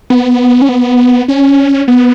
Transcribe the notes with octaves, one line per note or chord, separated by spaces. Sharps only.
B3
C#4
B3
C#4
B3